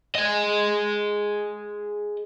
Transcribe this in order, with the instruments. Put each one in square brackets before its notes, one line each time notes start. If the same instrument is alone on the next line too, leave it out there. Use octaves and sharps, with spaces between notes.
[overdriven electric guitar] G#4 D#5